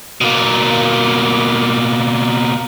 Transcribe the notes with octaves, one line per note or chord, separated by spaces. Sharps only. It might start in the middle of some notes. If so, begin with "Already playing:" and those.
B2 A#3